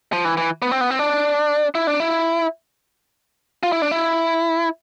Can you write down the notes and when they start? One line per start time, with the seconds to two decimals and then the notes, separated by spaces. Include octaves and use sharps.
0.13 F3
0.25 E3
0.37 E3
0.62 B3
0.71 C4
0.81 B3
0.90 C4
0.99 D4
1.75 E4
1.87 D4
2.00 E4
3.63 F4
3.72 E4
3.82 D4
3.91 E4